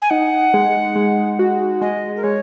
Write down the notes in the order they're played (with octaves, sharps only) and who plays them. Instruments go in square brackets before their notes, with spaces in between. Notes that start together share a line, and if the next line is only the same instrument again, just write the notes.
[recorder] G#5
[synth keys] D#4 [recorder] F#5
[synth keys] G#3
G#3
F#4
[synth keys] G#3 [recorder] D#5
[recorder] A#4
[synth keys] G#3 [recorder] C#5